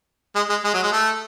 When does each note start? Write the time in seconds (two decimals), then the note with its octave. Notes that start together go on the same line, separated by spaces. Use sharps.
0.35 G#3
0.50 G#3
0.64 G#3
0.74 F#3
0.83 G#3
0.92 A3